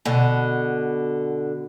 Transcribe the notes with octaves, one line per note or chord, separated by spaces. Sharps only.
B2 D3